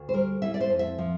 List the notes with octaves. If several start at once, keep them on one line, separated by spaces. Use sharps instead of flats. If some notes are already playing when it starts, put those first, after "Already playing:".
Already playing: D2
C5
G3 A#4
E3 E5
D5
C5
F2
E5
F3